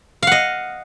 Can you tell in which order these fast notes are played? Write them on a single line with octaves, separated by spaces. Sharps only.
F5 F#5 D#5